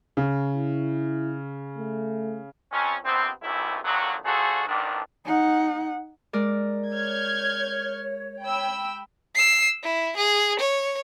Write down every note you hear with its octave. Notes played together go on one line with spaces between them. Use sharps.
C#3
E4
A3
F2 C#4
A#1 C3 B3 C4
B1 F#2 C3 A3 E4
G#1 F2 D3 D#3 F#3
D2 F3 A3 F#4 G#4 A4
A1 D#3 F3 D4
D#4 F#5
G#3 A#4 D5
C#5 F6 G6 G#6
G5 B5 E6
E6 C7
E4
G#4
C#5